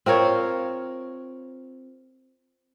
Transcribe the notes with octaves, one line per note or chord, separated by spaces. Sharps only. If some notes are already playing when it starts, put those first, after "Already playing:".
C4 F4 A#4 C#5